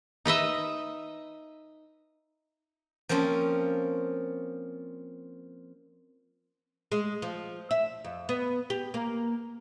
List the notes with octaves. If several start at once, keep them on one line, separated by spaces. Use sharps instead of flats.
D#4 B4 D#5 E5
F3 A#3 C4 C#4
G#3
F3
E5
F2
B3
G4
A#3